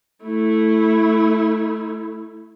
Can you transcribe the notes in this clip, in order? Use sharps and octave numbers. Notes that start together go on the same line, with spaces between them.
A3 E4